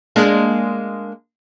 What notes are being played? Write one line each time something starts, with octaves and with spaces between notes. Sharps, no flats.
G#3 A#3 D4